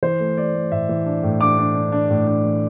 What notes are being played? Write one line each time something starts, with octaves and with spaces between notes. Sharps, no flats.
E3 C5
A3
A3 D5
A3
A2 E5
E3
D4
A2
D4 D6
D4
D4
D4
A2
D4
E3